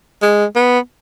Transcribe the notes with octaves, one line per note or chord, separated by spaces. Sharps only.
G#3
B3